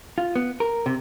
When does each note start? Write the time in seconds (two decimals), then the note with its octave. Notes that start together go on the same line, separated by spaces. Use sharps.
0.18 F4
0.35 B3
0.60 A#4
0.86 C3